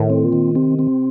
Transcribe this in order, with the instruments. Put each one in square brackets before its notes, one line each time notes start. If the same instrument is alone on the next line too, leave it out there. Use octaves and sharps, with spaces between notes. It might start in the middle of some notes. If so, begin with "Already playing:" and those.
Already playing: [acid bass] A2 [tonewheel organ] D#3
[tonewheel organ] C4
[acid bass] A#2
[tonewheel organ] D#3
[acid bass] C3 [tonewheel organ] C4
[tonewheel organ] C4